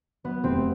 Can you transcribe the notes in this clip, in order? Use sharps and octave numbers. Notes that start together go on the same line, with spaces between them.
F#3 B3
F1 C4